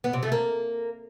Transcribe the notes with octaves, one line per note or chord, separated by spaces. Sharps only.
B3
C3
A3
A#3